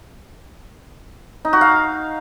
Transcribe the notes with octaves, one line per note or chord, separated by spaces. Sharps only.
D#4
F#4
F5